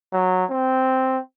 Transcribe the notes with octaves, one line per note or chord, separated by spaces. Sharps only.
F#3
C4